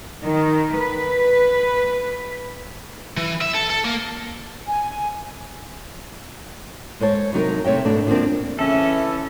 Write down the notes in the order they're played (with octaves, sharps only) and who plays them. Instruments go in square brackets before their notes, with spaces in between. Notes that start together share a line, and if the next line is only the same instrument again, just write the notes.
[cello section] D#3
B4
[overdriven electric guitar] E3
E5
A4
A4
A#3
[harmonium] G#5
[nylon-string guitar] G#3 C5 C#5 A5
C3 F#3 D#4 A#4
C3 A3 C#5 E5 G5
G#2 B2 A3 D4
D2 F3 G#3 A#3 C4 D4
[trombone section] C#3 E3 [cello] C#4 [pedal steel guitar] A4 [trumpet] E5